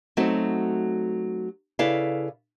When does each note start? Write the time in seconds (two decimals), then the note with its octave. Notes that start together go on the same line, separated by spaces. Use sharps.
0.17 F#3 A3 C4 D#4 F#4
1.79 C#3 E4 A4 B4 D5 F5